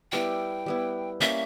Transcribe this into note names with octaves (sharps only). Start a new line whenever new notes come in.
G3 B3 E4 G5
G3 B3 E4
G3 A#3 C#4 E5